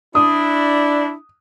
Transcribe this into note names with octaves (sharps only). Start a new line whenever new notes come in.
D4 E4 D#6